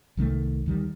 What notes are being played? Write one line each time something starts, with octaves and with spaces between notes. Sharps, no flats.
C2 D#3 G#3 A3
D2 D#3 G3